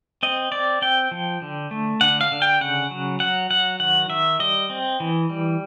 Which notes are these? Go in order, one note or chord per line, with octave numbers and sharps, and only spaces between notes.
C4 D#5
C4 D5
C4 G5
F3
D3
A3
D3 F#5
F5
D3
G5
C#3 F#5
F#3
F#3 F#5
F#3 F#5
D#3 F#5
D#3 E5
G3 D#5
C4
E3
G3